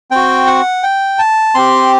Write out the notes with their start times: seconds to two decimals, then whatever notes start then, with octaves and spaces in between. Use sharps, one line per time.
0.11 C4 F#4 G5
0.47 F#5
0.83 G5
1.19 A5
1.55 C4 G4 C6